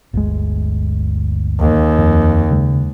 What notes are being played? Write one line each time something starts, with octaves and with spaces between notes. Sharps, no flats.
G1 D2 G#3
D#2
F2
C#3 G#3